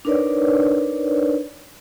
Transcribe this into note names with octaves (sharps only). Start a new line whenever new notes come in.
D4 D#4 A#4 B4 C#5 D5